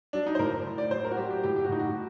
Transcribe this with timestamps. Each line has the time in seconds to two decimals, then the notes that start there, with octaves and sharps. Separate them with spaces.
0.13 F#3 D4
0.26 D#4
0.35 C5
0.39 A2 A#4
0.66 A2
0.78 D5
0.91 F#3 C5
1.04 A#4
1.11 F#4
1.17 F#3 G4
1.30 G4
1.43 A2 G4
1.56 G4
1.64 F#4
1.69 A2 D#4
1.79 F#4